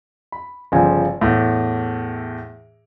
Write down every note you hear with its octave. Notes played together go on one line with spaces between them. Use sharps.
B5
G1 C#3 F3 G#5
E2 A2